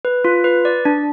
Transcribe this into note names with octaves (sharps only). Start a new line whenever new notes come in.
B4
F4
B4
D5
D4